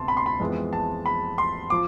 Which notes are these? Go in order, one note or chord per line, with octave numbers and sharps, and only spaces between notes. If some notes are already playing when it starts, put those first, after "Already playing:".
Already playing: D2 C3 B3 A5 C6
B5
C6
B5
F2 E3 G#3 B3
A5
B5
C6
F3 D6